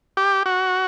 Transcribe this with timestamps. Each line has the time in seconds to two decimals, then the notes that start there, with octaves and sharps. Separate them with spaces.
0.17 G4
0.46 F#4